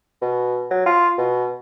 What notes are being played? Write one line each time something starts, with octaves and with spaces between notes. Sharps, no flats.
B2
F#3
F4
B2